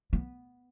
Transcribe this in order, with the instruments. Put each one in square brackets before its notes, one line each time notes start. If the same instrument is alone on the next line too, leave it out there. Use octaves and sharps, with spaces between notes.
[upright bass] B3